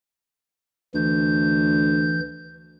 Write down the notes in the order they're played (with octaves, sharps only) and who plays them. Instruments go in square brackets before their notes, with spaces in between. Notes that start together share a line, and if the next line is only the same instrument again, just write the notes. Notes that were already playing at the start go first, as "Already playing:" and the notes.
[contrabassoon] D2 [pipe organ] E3 G6